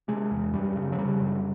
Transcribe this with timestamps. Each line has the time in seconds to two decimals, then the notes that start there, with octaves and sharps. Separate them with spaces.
0.08 C3 G#3
0.31 E2
0.53 F#2 G3
0.76 C#3
0.92 F#3
0.98 C#3 G3
1.21 F#2